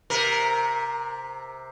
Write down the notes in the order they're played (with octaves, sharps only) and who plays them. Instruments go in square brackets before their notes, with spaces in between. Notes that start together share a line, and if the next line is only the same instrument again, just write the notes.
[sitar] C3 A#4